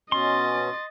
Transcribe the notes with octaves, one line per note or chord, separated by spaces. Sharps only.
B2 C#4 D#5 C6 A6